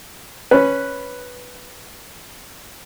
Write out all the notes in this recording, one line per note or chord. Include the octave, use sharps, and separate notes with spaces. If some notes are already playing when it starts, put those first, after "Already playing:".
C#4 B4